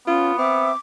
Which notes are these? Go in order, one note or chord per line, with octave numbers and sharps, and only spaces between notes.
B3 C#4 F4
C4 E5 D6